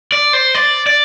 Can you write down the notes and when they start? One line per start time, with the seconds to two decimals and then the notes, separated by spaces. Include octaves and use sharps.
0.12 D5
0.33 C5
0.55 D5
0.86 D5